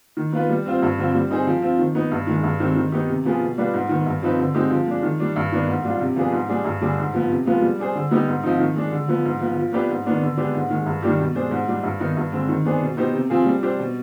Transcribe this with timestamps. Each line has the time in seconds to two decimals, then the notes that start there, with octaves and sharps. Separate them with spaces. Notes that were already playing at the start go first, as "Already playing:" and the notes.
0.17 D#3
0.32 B3 F4 B4
0.49 G3
0.66 C4 F4 C5
0.82 G2
0.98 D3 F3 C4 F4
1.14 G3
1.30 C4 D#4 G#4 C5
1.47 F3
1.62 C4 F4
1.79 D#3
1.95 B3 D#4
2.12 G2
2.27 D#3 G#3
2.43 G2
2.60 D#3 G#3 C4 G4
2.76 D#3
2.92 B3 D#4 G4
3.09 C3
3.25 F3 B3 F4 G#4
3.41 B2
3.58 G3 D4 F4 B4
3.74 G#2
3.89 D#3 B3
4.06 G2
4.22 F3 C4 D#4 B4
4.38 D3
4.54 G#3 C4 D#4 G4
4.70 F3
4.86 G#3 D4
5.03 D#3
5.20 G3 D4
5.36 G2
5.52 D#3 B3 D4
5.68 G#2
5.85 G3 D4 F4
6.00 C3
6.16 F3 B3 D4 G#4
6.32 G#2
6.49 G3 D4 G#4
6.65 G2
6.81 D3 G3 D4 G#4
6.98 G#2
7.14 F3 B3
7.29 C3
7.46 F3 G#3 B3 F4
7.62 G3
7.79 D4 G#4 C5
7.95 D3
8.11 G3 B3 D#4 G4
8.28 G#2
8.43 F3 C4 D#4
8.60 D#3
8.76 G#3 D4
8.92 D3
9.08 F3 B3
9.25 G#2
9.41 F3 B3
9.56 F3
9.73 B3 D4 G4 B4
9.90 G#2
10.06 D#3 B3 D4
10.22 D3
10.37 G#3 B3 D4 G4
10.54 G#2
10.70 D#3 G#3
10.86 G2
11.03 D#3 G3 D4 G4
11.19 B2
11.35 G#3 D4 G#4 C5
11.51 G#2
11.68 G3 D4
11.83 G2
12.00 D#3 B3 D#4
12.17 G2
12.32 D3 G#3 C4
12.49 D#3
12.65 B3 D4 G#4 C5
12.82 B2
12.97 B3 D#4 G4 C5
13.14 C3
13.30 F3 C4 F4 G#4
13.46 G3
13.63 D4 G4 C5
13.79 B2